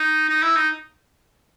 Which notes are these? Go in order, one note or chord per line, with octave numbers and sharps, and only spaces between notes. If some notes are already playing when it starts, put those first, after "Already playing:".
Already playing: D#4
D#4
E4
D#4